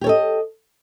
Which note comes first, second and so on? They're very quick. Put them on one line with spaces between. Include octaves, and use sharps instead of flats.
G4 C#5 A4 D#5